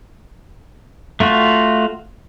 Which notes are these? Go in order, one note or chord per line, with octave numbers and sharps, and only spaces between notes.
A3 F4 F#4